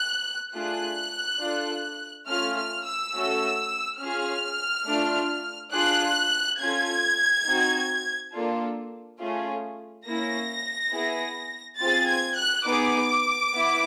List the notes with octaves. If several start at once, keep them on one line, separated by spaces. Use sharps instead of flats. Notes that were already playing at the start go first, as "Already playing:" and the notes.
Already playing: F#6
A3 D4 F4 G#4 F#6
D4 F4 A4
A3 C#4 F4 F6
F6
E6
A3 C#4 F#4 A4
C#4 F4 G#4 F6
A3 D4 F4
D4 F4 G#4 F#6
C#4 F4 A4 G#6
C4 D#4 F#4
A#3 D4 F4 A4
A3 C#4 F4 G#4
A#3 C#4 E4 A#6
B3 E4 G#4
C4 F4 G#4 A6
G#6
F#6
B3 D#4 G#4 D6
B3 E4